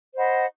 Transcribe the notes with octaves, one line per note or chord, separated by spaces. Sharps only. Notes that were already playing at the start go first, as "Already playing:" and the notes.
C5 D#5 F#5 B5